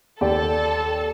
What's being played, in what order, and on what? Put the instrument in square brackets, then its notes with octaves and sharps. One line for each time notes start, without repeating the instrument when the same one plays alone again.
[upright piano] D#2 G4 D5 [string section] A4